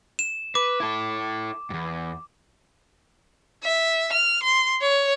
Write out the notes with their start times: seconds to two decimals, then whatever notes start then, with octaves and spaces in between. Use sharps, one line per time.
0.19 E7
0.55 B4 D6
0.80 E4 A4
1.70 E2 G2
3.63 E5
4.13 F6
4.43 C6
4.81 C#5